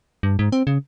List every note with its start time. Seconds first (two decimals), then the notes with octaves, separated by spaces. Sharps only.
0.23 G2
0.39 G#2
0.52 C4
0.67 C#3